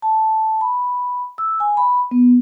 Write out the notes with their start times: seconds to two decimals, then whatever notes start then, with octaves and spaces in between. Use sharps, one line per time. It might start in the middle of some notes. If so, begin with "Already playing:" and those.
0.02 A5
0.61 B5
1.38 E6
1.60 G#5
1.77 B5
2.11 B3